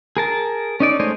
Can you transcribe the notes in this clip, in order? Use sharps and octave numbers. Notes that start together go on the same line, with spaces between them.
G#4 A#4 A5
C#4 D#4 D5
G#3 A3 C5 C#5 D#5